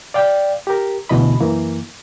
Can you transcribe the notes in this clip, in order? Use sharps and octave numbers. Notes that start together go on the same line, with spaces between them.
D5 F5 G5
G4 A#4
D2 B2 E3 D#5 B5
F#2 E3 A#3